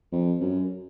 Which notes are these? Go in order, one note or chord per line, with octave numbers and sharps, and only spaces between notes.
F2
F#2